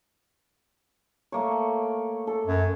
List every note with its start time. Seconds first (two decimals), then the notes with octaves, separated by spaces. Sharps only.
1.32 A3 A#3 C#5
2.27 A4
2.46 F#2